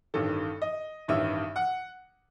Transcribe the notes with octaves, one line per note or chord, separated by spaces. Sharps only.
A1 G2 D#3 A4
D#5
A1 G2 D#3 E5
F#5